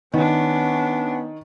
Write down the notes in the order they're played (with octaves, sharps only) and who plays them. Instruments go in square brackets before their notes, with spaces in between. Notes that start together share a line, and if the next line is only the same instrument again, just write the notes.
[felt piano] D#3 [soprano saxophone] B3 [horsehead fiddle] C#4 D4